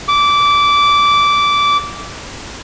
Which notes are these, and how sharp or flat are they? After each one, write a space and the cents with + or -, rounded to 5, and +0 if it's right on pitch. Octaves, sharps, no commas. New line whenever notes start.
D6 -15